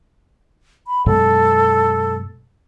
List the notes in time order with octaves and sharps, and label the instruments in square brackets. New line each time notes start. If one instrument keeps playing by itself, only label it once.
[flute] B5
[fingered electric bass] F#2 B2 G#3 [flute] A4